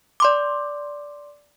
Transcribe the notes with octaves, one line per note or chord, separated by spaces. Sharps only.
D5 C6 D6